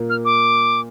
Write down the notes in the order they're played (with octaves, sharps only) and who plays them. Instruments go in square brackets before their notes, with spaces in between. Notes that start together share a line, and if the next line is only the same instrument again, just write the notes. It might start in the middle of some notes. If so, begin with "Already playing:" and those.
Already playing: [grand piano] A#2 A#3
[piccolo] F6
D6